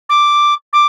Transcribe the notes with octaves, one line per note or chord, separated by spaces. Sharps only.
D6
D6